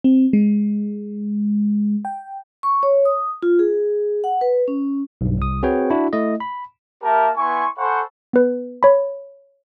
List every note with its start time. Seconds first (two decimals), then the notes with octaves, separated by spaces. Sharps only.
0.04 C4
0.33 G#3
2.05 G5
2.63 C#6
2.83 C#5
3.05 D#6
3.43 F4
3.59 G#4
4.24 F#5
4.41 B4
4.68 C#4
5.21 B1 G2
5.38 C2 D#6
5.63 C4 F#4 G#4 B4 C#5 G5
5.90 D4 E4 F#4
6.13 A3 E4 D#5
6.40 B5
7.03 A#3 G4 A#4 E5 A5
7.37 B3 E4 G#5 C6 C#6
7.78 A4 C5 F#5 G#5 B5 C#6
8.33 B3 B4
8.83 C#5 B5